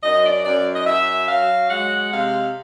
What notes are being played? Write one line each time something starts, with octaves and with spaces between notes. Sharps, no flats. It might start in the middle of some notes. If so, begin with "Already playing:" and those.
F#2 D#5
D5
F#2 D5
D#5
F#2 E5
F#3 F5
G#3 F#5
C3 F5